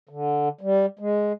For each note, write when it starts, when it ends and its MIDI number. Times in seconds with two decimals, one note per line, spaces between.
0.09 0.49 50
0.61 0.86 55
0.99 1.32 56